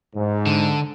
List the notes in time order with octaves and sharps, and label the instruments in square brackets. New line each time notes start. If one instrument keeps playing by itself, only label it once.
[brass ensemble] G#2
[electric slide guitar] D3